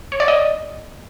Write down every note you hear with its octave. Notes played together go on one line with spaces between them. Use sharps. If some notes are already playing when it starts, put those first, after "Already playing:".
C#5
D5
D#5